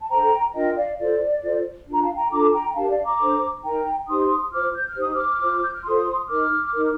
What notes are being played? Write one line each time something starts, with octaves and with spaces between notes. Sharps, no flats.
A5
D4 A4 C5 G5 A#5
D4 F4 A#4 D#5 G5
D5 F5
F4 A4 C5 D5
F4 A4 C5
D4 F4 A#4 A#5
F5 A5
G5 A#5
D4 F4 A4 A#5 D6
A5
G5 A#5
G5
D4 G4 A#4 F5 A5
D5 F5
A#5 D6
D4 A4 C5
D#4 A#4 G5 A#5
D#4 G4 C5 C6 D#6
F4 C5 D6 F6
G6
F6
D#4 G4 C5 D#6
D6 F6
F4 C5
G6
F6
F4 A4 C5 C6 D#6
D#4 A#4 D6 F6
D#4 A#4